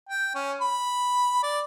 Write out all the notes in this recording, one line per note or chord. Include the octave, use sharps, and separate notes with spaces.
G5
C#4
B5
D5